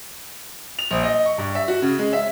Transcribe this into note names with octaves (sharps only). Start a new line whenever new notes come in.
F7
A#1
D#5
C#6
G2
E5
F#4
C#3
G#3
E5